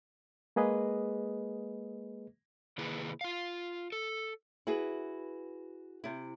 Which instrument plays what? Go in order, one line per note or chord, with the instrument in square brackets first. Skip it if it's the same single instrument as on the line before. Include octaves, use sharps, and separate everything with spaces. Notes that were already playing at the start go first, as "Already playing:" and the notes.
[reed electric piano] G#3 A#3 G#4 B4 D#5
[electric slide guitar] C3 D#3 A#3 E4 G#4 B4
F4 F5
A4
[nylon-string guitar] E4 F#4 G#4 B4
C3 E4